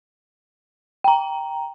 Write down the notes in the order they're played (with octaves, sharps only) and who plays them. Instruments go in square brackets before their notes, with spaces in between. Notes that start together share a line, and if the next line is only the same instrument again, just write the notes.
[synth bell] G5 A#5